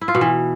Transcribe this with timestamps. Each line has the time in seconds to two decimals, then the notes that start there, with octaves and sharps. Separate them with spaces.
0.01 E4
0.08 F4
0.15 B2
0.21 E3